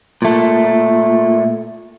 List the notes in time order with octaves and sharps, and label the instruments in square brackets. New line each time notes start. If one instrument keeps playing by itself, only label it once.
[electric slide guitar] A#2 A3